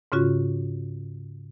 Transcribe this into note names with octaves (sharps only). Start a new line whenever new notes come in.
G#2 C#3 C#4 F4 F#4